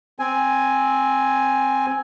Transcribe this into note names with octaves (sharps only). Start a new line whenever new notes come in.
C4 G#5